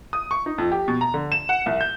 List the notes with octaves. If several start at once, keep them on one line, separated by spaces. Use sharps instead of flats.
D#6
C#6
D#4
F2
G4
B2
A#5
D3
E7
F#5
C2
G6